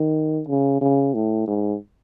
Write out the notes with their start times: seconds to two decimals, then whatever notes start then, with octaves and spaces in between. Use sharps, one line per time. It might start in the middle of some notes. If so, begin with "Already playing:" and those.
Already playing: D#3
0.48 C#3
0.81 C#3
1.14 A2
1.47 G#2